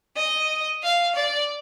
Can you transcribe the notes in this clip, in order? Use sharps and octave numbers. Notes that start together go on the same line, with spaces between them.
D#5
F5
D5